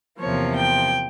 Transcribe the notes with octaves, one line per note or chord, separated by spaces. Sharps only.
E2 C3 F3 A#3 C#5
G5